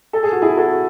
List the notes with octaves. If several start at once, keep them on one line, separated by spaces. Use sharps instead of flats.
A4
G#4
F#4
E4 G#4
F#4 A4